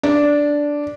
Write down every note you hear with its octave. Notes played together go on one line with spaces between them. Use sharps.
D4